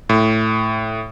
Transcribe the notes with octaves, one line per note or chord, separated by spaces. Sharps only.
A2